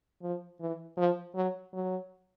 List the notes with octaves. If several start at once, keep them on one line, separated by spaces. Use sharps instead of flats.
F3
E3
F3
F#3
F#3